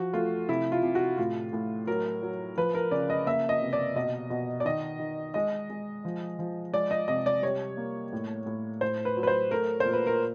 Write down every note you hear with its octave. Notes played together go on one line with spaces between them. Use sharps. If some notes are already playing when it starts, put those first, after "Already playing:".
Already playing: F3 F#4
A3 F4
C3 E4
F4
C3
F#4
A2 F4
A2
F#3 A#4
F#3
F3 B4
A#4
C#3 D5
D#5
A#3 E5
D#5
C3
D5
B2 D#5
B2
D5
D#3 D#5
D#3
G#3 D#5
G#3
F3
F3
G#3 D5
D#5
C3 D#5
D5
G3 C#5
A#3
A2
A2
A2 C5
B4
F#3
B4
C5
A3 A#4
A#2 C5
B4
A#4